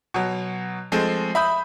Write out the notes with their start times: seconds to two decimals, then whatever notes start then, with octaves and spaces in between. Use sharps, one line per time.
0.14 B2 F#3
0.92 F3 G#3 A3 C4
1.35 E5 B5 D#6 G6